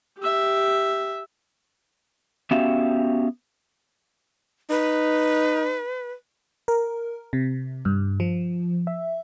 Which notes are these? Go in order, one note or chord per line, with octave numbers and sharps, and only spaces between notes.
G4 E5
B3 C#4 F#4 G4 E5 F5
D#4 B4
A#4
C3
G2
F3
E5